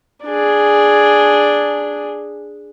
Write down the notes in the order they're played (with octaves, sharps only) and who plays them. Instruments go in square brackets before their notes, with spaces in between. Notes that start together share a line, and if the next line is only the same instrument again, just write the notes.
[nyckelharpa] D4 G#4